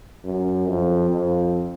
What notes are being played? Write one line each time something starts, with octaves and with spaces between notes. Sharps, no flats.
F#2
F2
F2